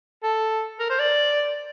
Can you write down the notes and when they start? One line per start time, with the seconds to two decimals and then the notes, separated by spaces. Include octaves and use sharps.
0.23 A4
0.80 A#4
0.90 C5
0.99 D5